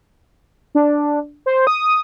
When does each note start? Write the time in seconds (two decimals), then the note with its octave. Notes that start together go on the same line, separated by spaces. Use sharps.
0.75 D4
1.46 C5
1.67 D#6